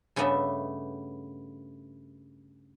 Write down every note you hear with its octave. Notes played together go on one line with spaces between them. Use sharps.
G2 C#3 A3 B3 D#5 E5